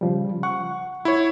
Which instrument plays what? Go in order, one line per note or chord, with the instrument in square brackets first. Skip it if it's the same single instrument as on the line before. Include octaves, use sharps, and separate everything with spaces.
[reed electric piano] C#3 F3 G3
[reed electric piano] F#5 [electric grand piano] C#6
[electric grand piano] E4 C#5